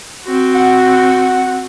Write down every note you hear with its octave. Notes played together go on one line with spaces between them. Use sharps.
C4 F#4
F#5